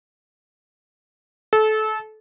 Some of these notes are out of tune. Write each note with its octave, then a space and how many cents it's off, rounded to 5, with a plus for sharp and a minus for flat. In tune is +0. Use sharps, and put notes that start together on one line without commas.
A4 -25